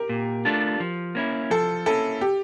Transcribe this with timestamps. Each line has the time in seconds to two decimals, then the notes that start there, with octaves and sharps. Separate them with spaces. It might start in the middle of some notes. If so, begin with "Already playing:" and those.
Already playing: G4 A#4
0.09 A#2
0.45 A3 D4 F4 A4
0.80 F3
1.15 A#3 C#4 E4
1.50 F3 A4
1.86 A#3 C#4 E4 A4
2.21 G4